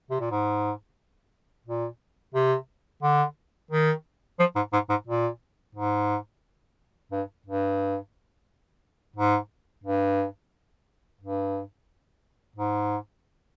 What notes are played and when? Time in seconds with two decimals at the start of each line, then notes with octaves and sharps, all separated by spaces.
0.11 C3
0.20 A#2
0.31 G#2
1.66 A#2
2.34 C3
3.03 D3
3.71 D#3
4.39 F3
4.56 G#2
4.73 G#2
4.90 G#2
5.07 A#2
5.75 G#2
7.12 G2
7.46 G2
9.16 G#2
9.84 G2
11.21 G2
12.56 G#2